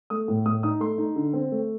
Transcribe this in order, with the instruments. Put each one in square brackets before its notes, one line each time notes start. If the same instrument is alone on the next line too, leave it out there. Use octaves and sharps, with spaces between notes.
[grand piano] A3 D#6
A2
A2 D#6
D#4 D#6
A3 C6
D#4
D3
C4
A3